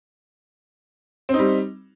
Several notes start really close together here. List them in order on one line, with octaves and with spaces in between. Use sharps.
C4 D#4 G3